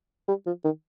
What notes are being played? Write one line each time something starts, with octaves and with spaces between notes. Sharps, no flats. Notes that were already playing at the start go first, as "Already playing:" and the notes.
G3
F3
D#3